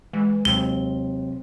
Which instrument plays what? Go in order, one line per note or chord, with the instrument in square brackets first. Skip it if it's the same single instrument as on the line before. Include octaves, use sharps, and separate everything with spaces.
[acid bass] E3 [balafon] G#3
[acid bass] D#2 [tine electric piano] C3 F#3 C4 [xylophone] G7